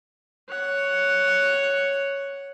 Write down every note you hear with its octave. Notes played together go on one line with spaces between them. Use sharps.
C#5 F#5